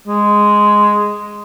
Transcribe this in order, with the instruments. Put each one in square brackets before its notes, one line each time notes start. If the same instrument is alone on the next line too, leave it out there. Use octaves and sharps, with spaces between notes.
[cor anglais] G#3